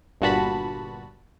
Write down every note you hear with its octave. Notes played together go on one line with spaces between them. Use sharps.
G1 G2 A#2 F#4 A5 B5